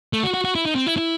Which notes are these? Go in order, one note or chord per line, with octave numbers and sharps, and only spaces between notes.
A3
F#4
F#4
F#4
E4
D#4
C4
E4
E4